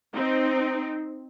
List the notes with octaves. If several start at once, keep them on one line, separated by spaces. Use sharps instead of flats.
C4 D#4